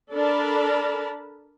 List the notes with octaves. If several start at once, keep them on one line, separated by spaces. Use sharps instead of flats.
D4 A4 A#4 A5 B5